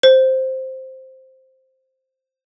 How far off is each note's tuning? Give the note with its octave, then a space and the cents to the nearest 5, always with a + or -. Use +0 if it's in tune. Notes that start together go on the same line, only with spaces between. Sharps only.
C5 +5